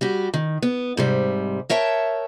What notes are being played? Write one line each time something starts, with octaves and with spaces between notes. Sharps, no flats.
G3 F#4 G4
D#3
B3
G#2 C3 G3
A#4 C#5 E5 G5 A5